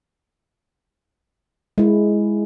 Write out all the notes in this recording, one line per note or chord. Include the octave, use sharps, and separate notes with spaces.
G#3 E4